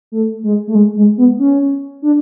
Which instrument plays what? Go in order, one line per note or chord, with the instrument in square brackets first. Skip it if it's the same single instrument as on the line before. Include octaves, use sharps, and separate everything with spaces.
[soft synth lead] A3
G#3
A3
G#3
G#3
B3
C#4
D4